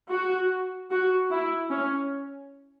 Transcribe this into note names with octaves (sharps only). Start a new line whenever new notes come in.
F#4
F#4
E4
C#4